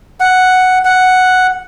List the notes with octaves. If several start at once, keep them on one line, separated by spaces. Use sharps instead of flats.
F#5
F#5